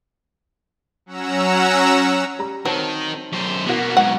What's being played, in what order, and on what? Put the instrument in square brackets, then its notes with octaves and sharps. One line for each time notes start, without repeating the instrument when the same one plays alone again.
[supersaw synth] F#3 C#4 F#5 A#5 E6
[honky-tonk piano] G3 A#5
[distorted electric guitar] D#3 [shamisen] F#3 [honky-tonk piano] C4 A5
[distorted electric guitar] F#2 C5
[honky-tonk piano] B2 F#4 [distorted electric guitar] A#3 B3
[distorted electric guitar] G#2 F#3 [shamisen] F#5